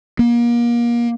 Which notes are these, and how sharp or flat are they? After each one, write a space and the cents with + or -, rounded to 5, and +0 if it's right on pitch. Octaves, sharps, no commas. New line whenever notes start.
A#3 +30